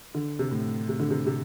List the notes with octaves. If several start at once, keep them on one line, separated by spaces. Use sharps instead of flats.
D3
C3
A2
C3
D3
C3
C3